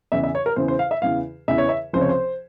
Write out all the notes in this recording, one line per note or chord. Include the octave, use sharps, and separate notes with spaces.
E2 C#3 E3 E5
E5
C#5
A#4
E2 C#3 E3 C5
C5
F5
E5
E2 C#3 E3 F5
E2 C#3 E3 E5
C#5
E5
C#2 C3 F3 C5
C#5
C5